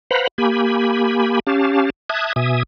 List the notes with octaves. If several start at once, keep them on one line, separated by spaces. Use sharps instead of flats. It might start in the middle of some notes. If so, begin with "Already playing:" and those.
B4 C5 F5 F#5 A#5 B5
A#3 G4 G#5 B5
C#4 G4 F5 A5
E5 A5 D#6 F#6 G#6
B2 E5 G#5 D#6